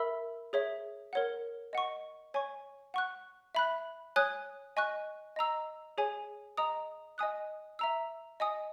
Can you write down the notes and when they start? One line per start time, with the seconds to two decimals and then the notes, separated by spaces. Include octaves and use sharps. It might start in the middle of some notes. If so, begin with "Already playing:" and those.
Already playing: A#4 E5 B5 E6
0.53 G#4 C#5 E5
1.13 A#4 C#5 F#5
1.73 D#5 F#5 C#6
2.34 C#5 G#5 C#6
2.94 F#5 C#6 F#6
3.55 E5 B5 F#6
4.16 C#5 G#5 D#6 F#6
4.77 D#5 G#5 C#6 F#6
5.36 D#5 A#5 E6
5.98 G#4 C#5 G#5
6.57 D#5 A#5 D#6
7.18 D#5 G#5 D#6 F#6
7.79 E5 A#5 E6
8.40 D#5 G#5 D#6